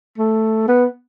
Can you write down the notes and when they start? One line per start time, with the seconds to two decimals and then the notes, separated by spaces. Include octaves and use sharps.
0.18 A3
0.68 B3